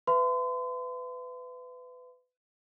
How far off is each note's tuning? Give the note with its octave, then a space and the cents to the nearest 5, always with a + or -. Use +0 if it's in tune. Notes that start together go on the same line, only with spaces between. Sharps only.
B4 +25 E5 +30 C6 -40